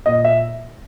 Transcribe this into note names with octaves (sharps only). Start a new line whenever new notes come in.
A#2 D#5
E5